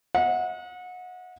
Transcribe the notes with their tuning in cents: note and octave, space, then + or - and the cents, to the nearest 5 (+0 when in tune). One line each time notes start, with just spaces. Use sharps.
D#5 +45 F#5 -30